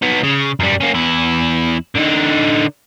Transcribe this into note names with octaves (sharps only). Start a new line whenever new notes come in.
B3 D#4
C#3
F#2 G3
A#3 C#4
E2 E4
D3 D#4